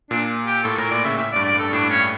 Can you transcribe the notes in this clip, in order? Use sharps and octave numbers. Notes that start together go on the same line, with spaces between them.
A#2 D4
G4
A2 A4
A2 A#4
A#2 D5
C#3 E5
A2 E5
D5
G2
D5
G2
A4
A2 D4
C#4